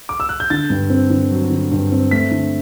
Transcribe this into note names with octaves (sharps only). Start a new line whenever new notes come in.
D6
E6
F#6
G6
D3 A6
G2
C4
D3
F#3
D3
G2
C4
A3 B6
D3